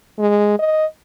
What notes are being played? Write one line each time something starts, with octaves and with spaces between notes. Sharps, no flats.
G#3
D#5